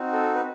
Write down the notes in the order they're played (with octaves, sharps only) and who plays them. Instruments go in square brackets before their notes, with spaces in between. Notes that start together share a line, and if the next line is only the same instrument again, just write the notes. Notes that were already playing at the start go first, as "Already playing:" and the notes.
Already playing: [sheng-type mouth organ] C4 D#4 F#4
A4
B4